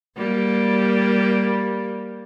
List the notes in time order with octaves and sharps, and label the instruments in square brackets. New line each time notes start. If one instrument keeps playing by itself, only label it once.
[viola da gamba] G3 A#3